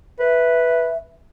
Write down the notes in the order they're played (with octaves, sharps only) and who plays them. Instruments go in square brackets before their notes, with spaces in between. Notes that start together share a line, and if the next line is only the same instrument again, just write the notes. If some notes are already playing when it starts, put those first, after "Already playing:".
[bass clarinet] B4 [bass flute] E5